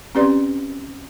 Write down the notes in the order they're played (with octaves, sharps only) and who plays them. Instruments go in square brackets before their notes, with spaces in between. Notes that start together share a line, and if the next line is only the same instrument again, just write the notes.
[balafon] C4 C#4 G4 B4 D5 C6